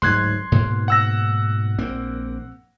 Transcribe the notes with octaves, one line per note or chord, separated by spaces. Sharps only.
D1 G#2 F#3 C6 F#6 G#6
G#2 B2 A#3
F#5 E6 A#6
A#1 A#3 C4